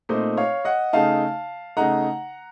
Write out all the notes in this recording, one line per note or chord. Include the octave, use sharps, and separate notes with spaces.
A#2 A3 C4 D#4 C5 D#5
C#5 F5
D#5 F#5
C#3 A3 D#4 F5 A5
C#3 A3 D#4 F#5 A#5